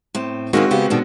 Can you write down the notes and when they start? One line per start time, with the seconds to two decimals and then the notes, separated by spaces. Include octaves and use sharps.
0.15 A2 C4
0.53 D#3 G#3 A#3 C4 C#4 F#4
0.71 C#3 B3 G4
0.90 B2 D#3 D4